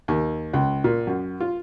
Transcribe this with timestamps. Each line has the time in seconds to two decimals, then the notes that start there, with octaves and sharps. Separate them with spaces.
0.08 D#2
0.53 C#2
0.84 A#2
1.07 F#2
1.40 F4